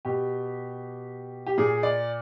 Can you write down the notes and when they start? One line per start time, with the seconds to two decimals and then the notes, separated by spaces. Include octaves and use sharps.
0.05 B2 G4
1.47 G4
1.58 A#2 G#4
1.83 D5